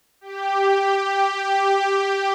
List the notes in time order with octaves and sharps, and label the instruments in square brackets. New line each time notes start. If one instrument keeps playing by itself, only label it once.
[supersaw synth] G4